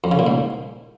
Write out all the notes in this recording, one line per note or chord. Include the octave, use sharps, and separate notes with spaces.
F2
C#3
A#2
G#2